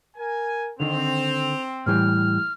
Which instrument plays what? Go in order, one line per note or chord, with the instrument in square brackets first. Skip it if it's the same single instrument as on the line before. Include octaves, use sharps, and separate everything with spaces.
[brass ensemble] A#4 G#5
[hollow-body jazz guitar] D3 D#3 [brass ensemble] C4 [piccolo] F7
[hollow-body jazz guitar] A2 E3 G3 [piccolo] F6